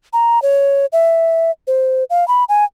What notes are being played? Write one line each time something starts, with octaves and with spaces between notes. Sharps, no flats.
A#5
C#5
E5
C5
F5
B5
G#5